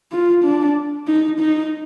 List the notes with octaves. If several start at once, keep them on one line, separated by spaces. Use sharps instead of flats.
F4
D4
D#4
D#4